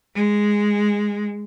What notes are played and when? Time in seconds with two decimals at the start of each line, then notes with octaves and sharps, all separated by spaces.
0.15 G#3